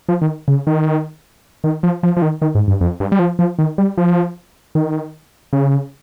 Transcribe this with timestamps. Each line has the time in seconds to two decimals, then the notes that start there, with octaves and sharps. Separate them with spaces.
0.09 F3
0.22 D#3
0.48 C#3
0.67 D#3
1.64 D#3
1.83 F3
2.03 F3
2.17 F3
2.22 D#3
2.42 D#3
2.55 G#2
2.68 G2
2.81 F2
3.00 G2
3.12 G3
3.19 F3
3.39 F3
3.59 D#3
3.78 G3
3.98 F3
4.75 D#3
5.53 C#3